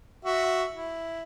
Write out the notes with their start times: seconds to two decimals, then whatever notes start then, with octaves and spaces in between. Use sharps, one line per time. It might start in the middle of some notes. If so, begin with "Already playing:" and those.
0.25 F#4 E5
0.74 E4